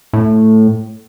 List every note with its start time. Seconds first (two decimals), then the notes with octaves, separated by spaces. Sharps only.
0.13 A2